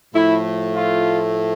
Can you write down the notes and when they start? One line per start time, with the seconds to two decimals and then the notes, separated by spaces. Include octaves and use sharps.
0.14 A2 F3 A3 E4
0.76 F4